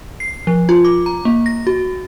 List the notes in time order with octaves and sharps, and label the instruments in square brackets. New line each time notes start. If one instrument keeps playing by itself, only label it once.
[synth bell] C7
F3
F4
D6
A#5
A#3
A#6
F#4